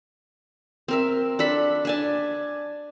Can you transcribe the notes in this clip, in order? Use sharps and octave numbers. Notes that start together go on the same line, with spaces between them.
C4 A#4 E5
D4 A4 B5
D4 G#5 A5